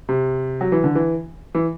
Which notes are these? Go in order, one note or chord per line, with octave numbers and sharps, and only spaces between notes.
C3
F#3
E3
D3
E3
E3